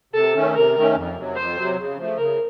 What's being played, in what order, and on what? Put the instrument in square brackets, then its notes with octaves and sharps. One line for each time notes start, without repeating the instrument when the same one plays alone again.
[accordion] C3 [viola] A4
[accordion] D#3 A3 C#4
[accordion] C3 [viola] A#4
[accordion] D#3 A3 C#4
F2
C3 F#3
[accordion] F2 [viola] C5
[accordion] C3 F#3
C#3
F3 A3
[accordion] C#3 [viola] A#4